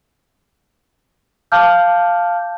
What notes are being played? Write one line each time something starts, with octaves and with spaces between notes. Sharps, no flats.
F5 A5 D6 F6 G6